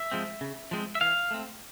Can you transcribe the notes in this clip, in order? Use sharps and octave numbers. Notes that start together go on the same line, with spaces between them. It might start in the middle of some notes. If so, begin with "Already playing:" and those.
Already playing: E5
F3 G#3 C4
C#3
F3 G#3 C4
E5
E3 F5
A3 C4